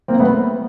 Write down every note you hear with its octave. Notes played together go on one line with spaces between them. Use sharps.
A#3 C4
A3 B3